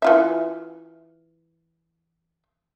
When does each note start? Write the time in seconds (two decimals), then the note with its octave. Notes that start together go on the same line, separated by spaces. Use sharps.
0.02 E3 F4 E5